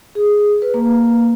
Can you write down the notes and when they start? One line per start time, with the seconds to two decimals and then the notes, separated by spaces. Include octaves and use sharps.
0.15 G#4
0.62 B4
0.74 A#3